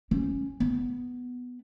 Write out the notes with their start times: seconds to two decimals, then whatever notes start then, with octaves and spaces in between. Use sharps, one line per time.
0.11 C#4
0.60 B3